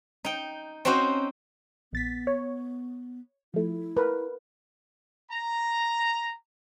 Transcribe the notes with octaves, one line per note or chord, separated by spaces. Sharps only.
D#4 G5
C4 C#4 D#4 F#4 C5
A#1 B3 A6 B6
C#5
F3 A3 E4
A#4 B4
A#5